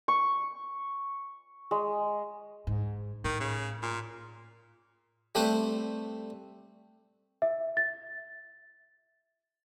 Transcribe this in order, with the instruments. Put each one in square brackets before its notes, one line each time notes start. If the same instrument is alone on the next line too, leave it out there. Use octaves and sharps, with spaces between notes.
[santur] C#6
G#3
[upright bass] G#2
[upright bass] A2 [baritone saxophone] D#3
[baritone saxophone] C#3
A#2
[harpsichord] G3 A3 C4 B4 C5
[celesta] E5
A6